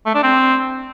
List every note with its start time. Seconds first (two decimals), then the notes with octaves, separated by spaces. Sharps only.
0.06 A3
0.14 D4
0.23 C4